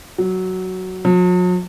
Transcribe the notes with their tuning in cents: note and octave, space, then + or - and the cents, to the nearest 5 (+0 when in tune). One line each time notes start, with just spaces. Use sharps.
F#3 +5
F#3 -45